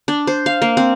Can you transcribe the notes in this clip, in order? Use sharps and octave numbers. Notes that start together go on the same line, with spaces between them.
D4
C5
F5
A#3
C4